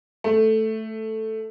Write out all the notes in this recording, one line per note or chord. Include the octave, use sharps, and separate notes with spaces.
A3